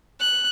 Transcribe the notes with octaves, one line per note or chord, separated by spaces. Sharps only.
F#6